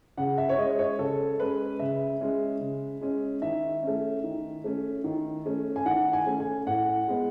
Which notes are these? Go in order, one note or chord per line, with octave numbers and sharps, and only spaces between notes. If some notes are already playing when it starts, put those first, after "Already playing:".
C#3 F#5
E5
C#5
G#3 C#4 D#5
C#5
C#3 A4
G#3 C#4 B4
C#3 E5
G#3 C#4
C#3
G#3 C#4
D#3 E5
A3 C#4
D#3
A3 C#4
D#3
A3 C#4
G#5
D#3 F#5
G#5
A3 C#4
G#5
A2 F#5
G#3 B3